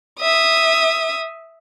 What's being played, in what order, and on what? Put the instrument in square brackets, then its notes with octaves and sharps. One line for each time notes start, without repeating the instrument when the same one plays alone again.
[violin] E5 D#6